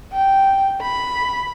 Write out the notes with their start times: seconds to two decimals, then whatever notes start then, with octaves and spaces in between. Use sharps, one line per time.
0.12 G5
0.81 B5